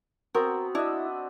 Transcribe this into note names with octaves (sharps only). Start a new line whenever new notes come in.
B3 C4 F#4 A#4
D4 E4 D#5 E5